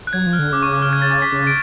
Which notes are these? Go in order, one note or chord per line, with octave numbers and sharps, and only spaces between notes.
F#6
F#3 G#6
F3
F6
D3
C#3 D6
C#6
D6
F6
G#6
A6
A6
B6
C#3
D7